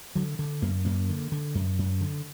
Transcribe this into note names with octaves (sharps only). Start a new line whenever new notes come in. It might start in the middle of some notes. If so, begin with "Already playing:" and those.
D3 F#3
D3
F#2 A#3
F#2 A#3
D3
D3
F#2
F#2
D3